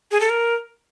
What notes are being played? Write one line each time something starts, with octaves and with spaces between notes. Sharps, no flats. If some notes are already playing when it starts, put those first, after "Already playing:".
G#4
A4
A#4